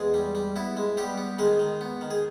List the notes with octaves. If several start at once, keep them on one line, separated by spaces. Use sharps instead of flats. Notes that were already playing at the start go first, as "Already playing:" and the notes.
Already playing: E2 G#3 G#4
G3
G3
B3 E4
G#3
G3 B3 G4
B3
D#3 G#3 G#4
D#3
B3
D#3
G#4